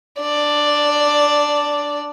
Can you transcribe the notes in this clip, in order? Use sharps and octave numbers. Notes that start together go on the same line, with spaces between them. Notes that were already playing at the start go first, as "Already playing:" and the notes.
D4 D5